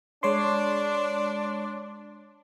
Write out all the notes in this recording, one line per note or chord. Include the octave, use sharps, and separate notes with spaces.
G#3 D4 C#5 C6